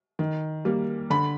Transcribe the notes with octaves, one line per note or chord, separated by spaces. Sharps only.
D#3
G3 A#3
D3 B5